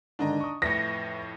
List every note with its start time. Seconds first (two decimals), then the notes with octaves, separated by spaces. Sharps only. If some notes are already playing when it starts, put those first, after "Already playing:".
0.19 G#2 D3 D#3 D4 D#5 A#5
0.40 C#6 D#6
0.62 F2 A2 B4 E5 A#6 C#7